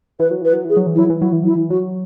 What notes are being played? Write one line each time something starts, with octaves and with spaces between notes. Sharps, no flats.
E3 B4
F#3
E3 B4
F#3
E3 G#4
F#3
E3
E4
F#3
E3
F#3 E4
E3
F#3 E4
E3
F#3 F#4